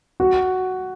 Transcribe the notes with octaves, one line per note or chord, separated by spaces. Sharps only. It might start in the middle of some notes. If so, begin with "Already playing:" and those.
F#4